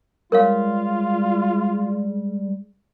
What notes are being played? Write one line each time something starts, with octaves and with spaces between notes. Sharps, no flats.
G3 G#3 F4 A#4 C#5 F5